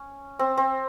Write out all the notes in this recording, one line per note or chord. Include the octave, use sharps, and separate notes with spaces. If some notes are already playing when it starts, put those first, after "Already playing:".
Already playing: C#4
C4
C4